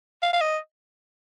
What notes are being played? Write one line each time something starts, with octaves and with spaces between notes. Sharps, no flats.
F5
F5
D#5